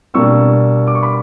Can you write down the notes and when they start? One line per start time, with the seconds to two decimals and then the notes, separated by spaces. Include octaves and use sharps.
0.14 B2 G3 A#3 D4 C#6 E6
0.87 D6
0.95 C#6
1.03 B5 D6